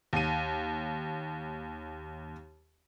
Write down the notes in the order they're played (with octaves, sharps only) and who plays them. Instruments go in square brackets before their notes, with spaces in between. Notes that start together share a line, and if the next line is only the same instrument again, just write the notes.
[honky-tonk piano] D#2 D#7